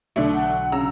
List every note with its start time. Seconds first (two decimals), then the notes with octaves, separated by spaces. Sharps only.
0.16 B1 D3 F#3 A3 D4
0.34 F#5
0.72 C#3 A#5 E6